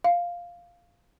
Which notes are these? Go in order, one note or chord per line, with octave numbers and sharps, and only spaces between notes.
F5